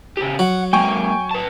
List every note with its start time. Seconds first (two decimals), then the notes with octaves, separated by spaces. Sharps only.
0.17 C#3 G4
0.39 F#3 F#5
0.73 G#3 A#3 G5 G#5 C#6
1.31 B4 A5